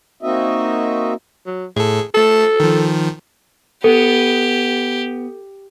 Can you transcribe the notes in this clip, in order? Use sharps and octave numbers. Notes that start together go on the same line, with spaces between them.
A#3 C4 D#4 F#4 D#5 E5
F#3
A2 G#4 A4
A3 A4 A5
D#3 F3
B3 G4 A4